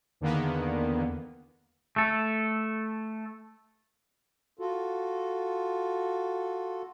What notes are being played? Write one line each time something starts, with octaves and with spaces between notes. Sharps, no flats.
E2 D3 D#3 A#3 B3
A3 A4
F4 F#4 A4